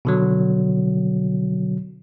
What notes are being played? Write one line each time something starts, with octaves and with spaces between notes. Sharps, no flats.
B2 D3 F#3